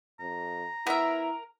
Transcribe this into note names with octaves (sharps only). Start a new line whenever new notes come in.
F2 A#5
B3 E4 A#4 E5